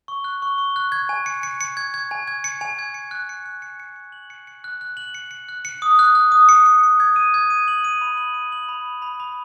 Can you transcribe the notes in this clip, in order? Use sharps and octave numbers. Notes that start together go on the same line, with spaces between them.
C#6
F#6
C#6
C#6
F#6
G#6
G#5
C#7
C#7
C#7
G#6
G#6
G#5
G#6
C#7
G#5
G#6
C#7
F#6
C#7
F#6
C#7
C#7
C#7
F#7
C#7
C#7
F#6
F#6
F#7
C#7
C#7
F#6
C#7
D#6
F#6
F#6
D#6
C#7
C#7
C#7
G#6
D#7
G#6
D#7
F#7
D#7
B5
F#7
D#7
F#7
B5
B5
B5
B5